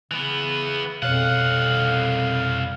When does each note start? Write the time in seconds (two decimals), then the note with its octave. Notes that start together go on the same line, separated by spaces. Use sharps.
0.11 C#3 E3 B3
1.03 C2 F2 B2 C#5 F5 F#5 F#6